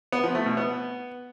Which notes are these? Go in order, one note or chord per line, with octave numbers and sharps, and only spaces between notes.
B3
F3
A3
B2
B3